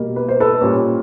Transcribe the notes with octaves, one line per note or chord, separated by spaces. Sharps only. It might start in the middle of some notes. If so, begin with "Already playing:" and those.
Already playing: B2 G3 A#3
B4
C5
A4 B4
A#2 G3 A#3 C#4